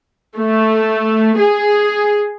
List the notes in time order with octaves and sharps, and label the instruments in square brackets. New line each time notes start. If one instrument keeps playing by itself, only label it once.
[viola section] A3
G#4